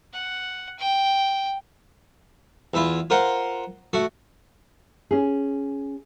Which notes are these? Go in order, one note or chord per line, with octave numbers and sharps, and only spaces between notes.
F#5
G5
E2 E4 F4
F4 A#4 C5 F#5
A3 F#4
C#4 G#4